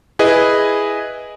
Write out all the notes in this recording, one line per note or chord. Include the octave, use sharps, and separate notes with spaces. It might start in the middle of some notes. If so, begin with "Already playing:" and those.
E4 G#4 B4 D#5